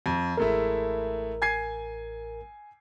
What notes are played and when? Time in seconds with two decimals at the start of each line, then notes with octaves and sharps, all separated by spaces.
0.06 F2
0.37 A1 G#3 A3 E4 A#4
1.42 G#5 G#6 C7